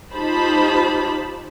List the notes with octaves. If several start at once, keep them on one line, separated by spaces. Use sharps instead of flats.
D#4 F4 G4 C5 A5 B5